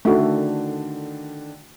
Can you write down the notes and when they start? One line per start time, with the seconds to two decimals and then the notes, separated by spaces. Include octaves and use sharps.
0.05 D3 D#3 A3 D4 F#4